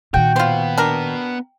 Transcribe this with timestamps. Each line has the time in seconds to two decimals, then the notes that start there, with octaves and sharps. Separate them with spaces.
0.14 A#2 D#3 F#4 G5
0.36 B3 F4 F#4 C5
0.78 D4 A#4